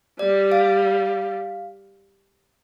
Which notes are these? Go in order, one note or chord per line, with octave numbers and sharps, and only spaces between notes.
G3 D5
F5